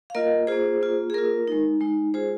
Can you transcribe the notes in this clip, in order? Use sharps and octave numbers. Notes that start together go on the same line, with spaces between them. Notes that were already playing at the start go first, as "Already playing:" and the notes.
F5
A#3 F4 A#4 D#5
A#3 F4 G#4 C5
A#3 F4
G#4
A#3 F4 A#4
G#3 D#4
G#3 D#4
G#3 F4 G#4 C5